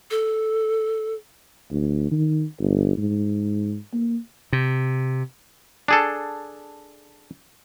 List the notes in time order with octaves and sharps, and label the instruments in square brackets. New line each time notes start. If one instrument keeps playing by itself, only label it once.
[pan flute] A4
[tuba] D2
D#3
G1
G#2
A#3
[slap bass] C3
[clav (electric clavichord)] D4 G#4 A4